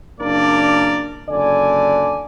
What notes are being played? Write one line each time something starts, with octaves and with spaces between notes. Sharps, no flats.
F#1 A#3 D4 A#4 D5
F#1 D3 D5 G#5